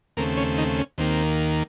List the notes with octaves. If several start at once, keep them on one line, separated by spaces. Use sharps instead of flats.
D#2 C#3 A3 A#3 C4 A#4
C#4 C#5
D#3 D#4
C#4
D#2 D#3 A#3 C4